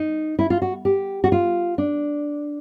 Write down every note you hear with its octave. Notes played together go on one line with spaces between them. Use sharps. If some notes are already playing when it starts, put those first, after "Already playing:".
Already playing: D#4
E4
F4
F#4
G4
F#4
F4
D4